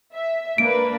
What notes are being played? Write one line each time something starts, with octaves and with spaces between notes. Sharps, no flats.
E5
A#3 D4 B4 D7